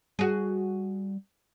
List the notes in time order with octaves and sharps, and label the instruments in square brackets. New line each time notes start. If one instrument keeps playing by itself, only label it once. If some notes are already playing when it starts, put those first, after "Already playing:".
[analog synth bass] G3 [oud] F#4 G#4